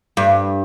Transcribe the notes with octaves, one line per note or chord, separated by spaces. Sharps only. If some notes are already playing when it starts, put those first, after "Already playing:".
G2